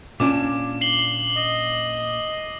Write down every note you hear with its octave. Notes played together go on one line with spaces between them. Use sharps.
A#2 C#4 D4 D6
C7 F#7 G7
D#5